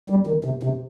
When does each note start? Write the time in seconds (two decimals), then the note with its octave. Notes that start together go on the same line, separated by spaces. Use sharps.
0.10 G3
0.27 D#3
0.44 C3
0.63 C3